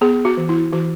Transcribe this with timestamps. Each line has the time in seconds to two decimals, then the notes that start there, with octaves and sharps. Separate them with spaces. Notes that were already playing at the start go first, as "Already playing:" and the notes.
0.01 B3 G#4
0.25 F#4
0.37 E3
0.49 E4
0.73 E3 F#4